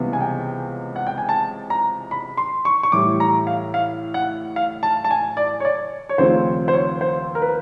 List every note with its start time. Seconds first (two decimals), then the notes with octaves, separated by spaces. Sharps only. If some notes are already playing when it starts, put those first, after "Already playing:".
Already playing: C#2 C3 E3 G3 B3
0.13 G#5
0.21 G5
0.96 F#5
1.07 G5
1.18 G#5
1.29 A5
1.70 A#5
2.11 B5
2.37 C6
2.65 C#6
2.83 C#6
2.92 A2 E3 G3 D6
3.20 A#5
3.47 F5
3.74 F5
4.14 F#5
4.56 F5
4.83 A5
5.04 A5
5.11 G#5
5.37 D5
5.60 C#5
5.65 D5
6.09 C#5
6.18 D#2 C#3 F3 A3 C4 C5
6.68 C5
6.74 C#5
7.01 C5
7.35 A#4
7.42 B4